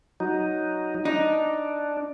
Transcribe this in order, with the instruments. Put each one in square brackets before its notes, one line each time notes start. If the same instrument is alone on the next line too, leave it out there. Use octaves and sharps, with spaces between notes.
[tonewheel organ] F#3 D#4
[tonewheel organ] D4 [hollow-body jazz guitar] D#4